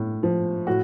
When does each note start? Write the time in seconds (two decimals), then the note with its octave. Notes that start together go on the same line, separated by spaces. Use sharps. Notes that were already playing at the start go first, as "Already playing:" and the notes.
Already playing: A2
0.23 F3
0.67 A2 F#4